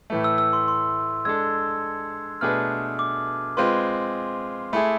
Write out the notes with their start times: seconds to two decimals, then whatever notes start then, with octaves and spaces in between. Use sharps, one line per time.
0.10 A2 E3 A3
0.24 E6
0.38 E6
0.53 C6
0.68 C6
1.25 G#3 D4 A4 E6 G#6
2.41 B2 A3 D4 G#4 B4 F6
2.99 D6
3.57 G#3 C4 F4 B4 C6
4.73 A3 E4 G#4 B5